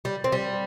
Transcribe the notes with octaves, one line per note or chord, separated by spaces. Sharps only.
G3
C4
G3